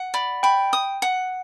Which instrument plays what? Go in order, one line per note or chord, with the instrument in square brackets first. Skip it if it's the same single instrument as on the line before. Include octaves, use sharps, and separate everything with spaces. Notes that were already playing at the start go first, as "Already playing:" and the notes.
Already playing: [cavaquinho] F#5
[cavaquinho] D5 [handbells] B5
[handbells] G5 [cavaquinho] B5
[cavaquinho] D#6
F#5